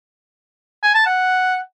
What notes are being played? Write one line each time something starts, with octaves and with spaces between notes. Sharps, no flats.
G#5
A5
F#5